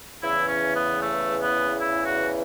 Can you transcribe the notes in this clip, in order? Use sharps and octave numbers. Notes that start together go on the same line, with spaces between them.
E2 C#3 E3 E4
C#4
B3
A3
B3
E4
F#4